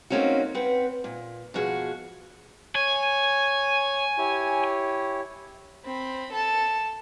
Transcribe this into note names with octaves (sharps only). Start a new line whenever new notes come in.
A3 A#3 C4 C#4 D#4 F#4
C4 B4 F#5
A#2
B2 F3 F#4 G#4
C#5 G#5
E4 G4 C#5
C4 B5
A4 A5